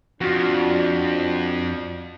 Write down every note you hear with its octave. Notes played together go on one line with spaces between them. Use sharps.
F2 D4 F4 F#4